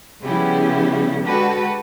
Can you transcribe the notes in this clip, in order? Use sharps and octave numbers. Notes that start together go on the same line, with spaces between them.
C#3 F3 G3 B3 E4 G4
D3 G#3 F#4 G4 A4 B4